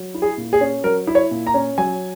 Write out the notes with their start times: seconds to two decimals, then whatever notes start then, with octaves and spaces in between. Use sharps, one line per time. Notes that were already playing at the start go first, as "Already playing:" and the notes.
Already playing: F#3
0.14 E4
0.22 G#4
0.38 A#2
0.53 G#4
0.61 C#4
0.84 F#3 A#4
1.07 E4
1.15 C#5
1.31 A#2
1.47 A#5
1.54 C#4
1.78 F#3 G#5